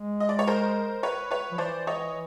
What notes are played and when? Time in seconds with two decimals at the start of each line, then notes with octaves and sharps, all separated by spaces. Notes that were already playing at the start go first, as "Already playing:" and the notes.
Already playing: G#3
0.20 D#5
0.29 D5
0.39 C#5
0.47 A#4 C5
1.03 B4 C#5
1.31 B4 C#5
1.52 F3
1.58 E3 C5 D5
1.87 C#5 D#5